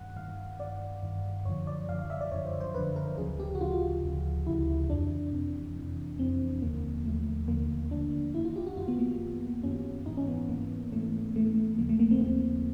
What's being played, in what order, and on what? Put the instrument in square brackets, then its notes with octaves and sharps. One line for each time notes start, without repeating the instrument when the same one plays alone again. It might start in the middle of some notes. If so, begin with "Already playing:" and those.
Already playing: [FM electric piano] G2 D#3 F#5
G2 D#3 F5
G2 D#3 D5
G2 D#3
F#2 D3 F3 C#5
D5
F#2 D3 F3 F5
F5
E5
D5
F#2 D3 F3 C#5
C5
C5
F#2 D3 F3 B4
A#4
D2 C#3 F3 G#4
G4
F#4
D2 C#3 F3 F4
D2 C#3 F3
D2 C#3 F3 E4
F2 C3 E3 D4
F2 C3 E3
F2 C3 E3
F2 C3 E3 C4
D#2 D3 F3 A#3
D#2 D3 F3 A3
D#2 D3 F3 A#3
D#2 D3 F3 D4
F#2 E4
D#3
F4
G4
F#4
F#2 D#3 F4
B3
A#3
F#2 D#3
F#2 D#3 C#4
G#2 E3 D#4
C#4
B3
G#2 E3 A#3
G#2 E3 A3
G#2 E3 A3
D#2 C#3 F3 A#3
A3
A#3
C4
D#2 C#3 F3 C4